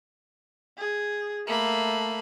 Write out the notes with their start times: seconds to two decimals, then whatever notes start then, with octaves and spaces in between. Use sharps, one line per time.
0.78 G#4
1.47 A3 A#3 B5